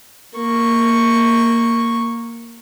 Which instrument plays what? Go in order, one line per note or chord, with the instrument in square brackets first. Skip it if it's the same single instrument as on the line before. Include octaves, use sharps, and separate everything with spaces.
[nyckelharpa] A#3 C#6